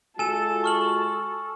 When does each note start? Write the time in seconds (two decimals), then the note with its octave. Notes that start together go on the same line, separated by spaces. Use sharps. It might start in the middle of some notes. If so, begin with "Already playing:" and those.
0.19 G#3 F4 F#4 A4 G#5 A5 E7
0.64 C#6 F6 F#7